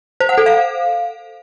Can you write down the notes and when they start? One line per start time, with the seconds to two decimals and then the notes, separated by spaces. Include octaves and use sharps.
0.20 C5
0.29 F#5
0.38 A4
0.46 F5